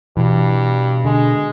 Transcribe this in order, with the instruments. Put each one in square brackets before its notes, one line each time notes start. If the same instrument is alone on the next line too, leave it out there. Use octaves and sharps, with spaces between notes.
[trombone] G2 [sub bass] B2 [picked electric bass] E3
[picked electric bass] D3 [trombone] G#3